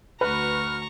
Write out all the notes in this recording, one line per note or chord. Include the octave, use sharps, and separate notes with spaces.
D2 F#4 B4 A#5 C#6 F6